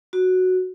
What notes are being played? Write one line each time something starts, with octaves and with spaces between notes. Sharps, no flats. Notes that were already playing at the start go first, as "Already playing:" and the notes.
F#4